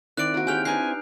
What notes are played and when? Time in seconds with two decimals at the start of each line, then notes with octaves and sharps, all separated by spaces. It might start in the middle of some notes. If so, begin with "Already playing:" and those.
0.17 D#3 C4 E4 D5 F#6 D7
0.34 A#3 F#4
0.47 G#3 G4 C#5 G#5 F6 G6 F7
0.65 D4 D#4 B4 G#5 G6 C7